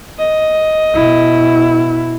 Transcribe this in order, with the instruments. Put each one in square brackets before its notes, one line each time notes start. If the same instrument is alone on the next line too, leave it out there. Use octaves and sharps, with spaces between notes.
[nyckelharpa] D#5
[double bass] B2 E4